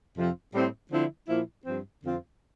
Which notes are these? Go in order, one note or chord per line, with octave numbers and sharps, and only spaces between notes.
F2 C3 F3 C4 F4
A2 G3 C4 E4
D3 F3 C4 E4
A#2 F3 A#3 E4
G2 F3 C4
F2 D3 F3 C4 F4